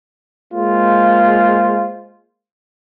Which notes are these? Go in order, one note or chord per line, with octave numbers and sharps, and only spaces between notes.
G#3 A#3 F4 C5